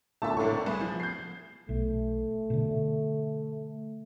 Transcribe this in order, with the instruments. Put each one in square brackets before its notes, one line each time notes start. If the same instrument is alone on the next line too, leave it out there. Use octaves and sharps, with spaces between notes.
[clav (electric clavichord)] A#2 D3 A3 [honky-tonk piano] E5 A5
[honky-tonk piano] G#1 A4 C#6 [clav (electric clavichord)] A2 A#3 D4
[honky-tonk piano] C2 [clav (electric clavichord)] G#4 B4
[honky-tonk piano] F3
G6 C7
[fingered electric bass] B1 [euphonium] A3
[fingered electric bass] B2 D3